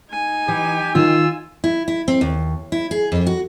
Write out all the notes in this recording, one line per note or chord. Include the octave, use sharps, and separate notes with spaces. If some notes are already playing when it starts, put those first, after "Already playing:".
D#4 G#5
E3 G4
D#3 F4 E6
E4
E4
C4
D#2
E4
G#4
F2
F#4